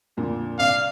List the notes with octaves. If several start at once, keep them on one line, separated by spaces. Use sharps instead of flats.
F2 A#2 D3
C2 D5 F5